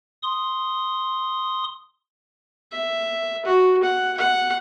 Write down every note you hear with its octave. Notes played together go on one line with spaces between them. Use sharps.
C6 D#6
E5
F#4
F#5
F#5